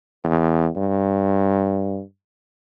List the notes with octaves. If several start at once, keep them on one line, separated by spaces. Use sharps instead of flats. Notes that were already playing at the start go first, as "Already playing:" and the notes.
E2
G2